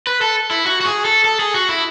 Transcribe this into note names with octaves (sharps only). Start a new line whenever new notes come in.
B4
A4
E4
F#4
F#4
G#4
A4
A4
G#4
F#4
E4